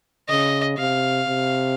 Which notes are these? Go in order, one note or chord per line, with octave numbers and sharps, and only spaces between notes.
C#3 D#5
C3 F5
C3